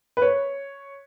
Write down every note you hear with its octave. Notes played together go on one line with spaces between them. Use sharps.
B4
C#5